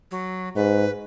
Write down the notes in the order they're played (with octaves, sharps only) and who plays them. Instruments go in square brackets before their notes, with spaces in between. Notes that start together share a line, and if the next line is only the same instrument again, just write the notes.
[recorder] F#3
[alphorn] G#2 [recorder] B4